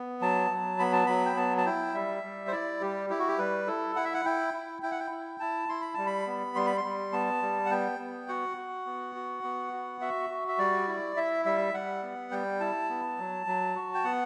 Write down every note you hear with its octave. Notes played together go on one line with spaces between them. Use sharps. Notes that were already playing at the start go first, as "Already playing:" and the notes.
Already playing: B3
F#3 A5
F#3
B3 B5
A5
F#3 B5
G5
B3 A5
A5
E4 G5
G3 E5
G3
C5
E4 D5
G3 G4
E4 G4
F#4
G4
G3 B4
E4 A4
E4 F#5
E5
F#5
E4 G5
E4
E4 G5
F#5
G5
E4
E4 A5
E4 C6
B5
G3 A5
B5
B3
G3 C6
B5
C6
G3
B3 A5
G3
F#5
B3 G5
B3
F#4 F#5
F#4
B3
F#4
B3
F#4
F#4 E5
F#4
E5
G3 D5
E4
E4 E5
G3 E5
G3 F#5
B3
G3 G5
E4 A5
B3
F#3
F#3
F#4
G5
B3 F#5